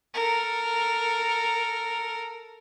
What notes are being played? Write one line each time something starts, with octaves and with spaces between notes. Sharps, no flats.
A4 A#4